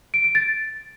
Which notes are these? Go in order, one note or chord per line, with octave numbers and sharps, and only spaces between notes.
D7
D7
A6